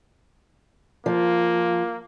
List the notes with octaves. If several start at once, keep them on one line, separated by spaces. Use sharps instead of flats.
F3 A#3